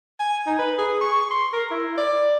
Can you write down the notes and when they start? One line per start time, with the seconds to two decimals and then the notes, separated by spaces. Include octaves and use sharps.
0.20 G#5
0.47 D#4
0.59 B4
0.78 G#4
1.01 C#6
1.31 C6
1.53 A#4
1.71 E4
1.98 D5